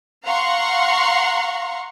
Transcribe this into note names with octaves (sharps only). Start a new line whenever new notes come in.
F5 F#5 A#5 C6 C#6